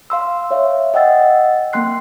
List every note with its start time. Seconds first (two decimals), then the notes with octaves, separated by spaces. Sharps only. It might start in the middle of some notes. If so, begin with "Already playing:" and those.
0.10 F5 C6 E6
0.51 C#5 E5 F5
0.94 D#5 F#5 G5 E6 A6
1.73 A#3 C4 G5 C6 F#6 C7